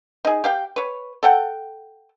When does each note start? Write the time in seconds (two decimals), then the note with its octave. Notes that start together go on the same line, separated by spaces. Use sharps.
0.25 D#4 G#4
0.44 G4 F5 G5
0.76 B4 C#5
1.23 A4 F#5 G5